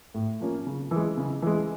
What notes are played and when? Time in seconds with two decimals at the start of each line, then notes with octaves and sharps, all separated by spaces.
0.14 A2
0.40 F3 A#3 C#4
0.67 C#3
0.91 E3 G#3
1.18 C#3
1.42 E3 G#3